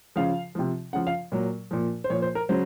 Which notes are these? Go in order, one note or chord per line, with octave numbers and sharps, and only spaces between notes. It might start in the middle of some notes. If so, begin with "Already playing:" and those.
C#3 F3 F5
C3 F3
C#3 F3 F#5
F5
A#2 F#3
A#2 F3
C5
A#2 F3 C#5
C5
A#4
C#3 F#3 C5